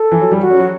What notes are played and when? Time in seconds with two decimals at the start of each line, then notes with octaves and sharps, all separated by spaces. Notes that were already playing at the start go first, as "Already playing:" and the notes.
Already playing: A4
0.12 E3
0.21 F#3
0.32 G3
0.40 F#4
0.50 C#4
0.59 F#3